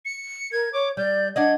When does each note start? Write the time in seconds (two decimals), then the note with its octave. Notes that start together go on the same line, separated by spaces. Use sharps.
0.05 C#7
0.52 A#4 G#6
0.73 C#5 D6
0.97 G3 D5 G6
1.36 D4 D5 D#5 F#5 G#6